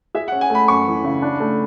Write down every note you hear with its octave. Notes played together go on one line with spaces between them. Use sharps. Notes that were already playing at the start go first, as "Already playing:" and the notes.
G#4 E5
F#5
C#4
G#5
A3 B5
F#2 C#6
E3
C#3
D4
A3